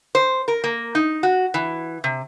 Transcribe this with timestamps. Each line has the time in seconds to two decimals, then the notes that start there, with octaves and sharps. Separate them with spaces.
0.15 C5
0.48 A#4
0.64 A#3
0.95 D#4
1.23 F#4
1.54 E3
2.04 C3